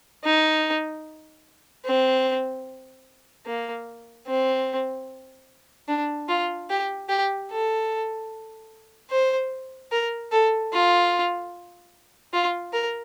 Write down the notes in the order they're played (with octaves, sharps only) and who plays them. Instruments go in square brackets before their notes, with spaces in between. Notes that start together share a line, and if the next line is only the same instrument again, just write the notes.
[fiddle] D#4
C4
A#3
C4
D4
F4
G4
G4
A4
C5
A#4
A4
F4
F4
A#4